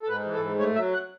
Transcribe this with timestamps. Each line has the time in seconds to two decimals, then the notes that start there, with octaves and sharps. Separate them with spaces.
0.03 A4
0.09 G#2 B4
0.25 E3
0.33 A4
0.42 G#2
0.59 A3 C#5
0.76 F#3 E5
0.93 F#5